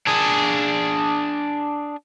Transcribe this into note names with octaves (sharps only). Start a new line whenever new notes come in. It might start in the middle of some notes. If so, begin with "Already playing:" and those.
D4 G#4